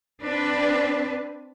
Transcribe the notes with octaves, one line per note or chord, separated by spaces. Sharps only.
C4 D4 B4